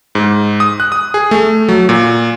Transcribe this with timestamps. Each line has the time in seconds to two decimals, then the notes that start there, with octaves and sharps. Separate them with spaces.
0.15 G#2
0.60 D#6
0.80 F#6
0.92 D#6
1.14 G#4
1.31 A3
1.69 F#3
1.89 A#2